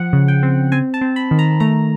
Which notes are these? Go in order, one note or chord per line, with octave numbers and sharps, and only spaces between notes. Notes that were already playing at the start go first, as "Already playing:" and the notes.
Already playing: F3 F#5
C#3
G5
C4
C4 G#5
A5
C4
B5
D#3
A#5
A3 A#5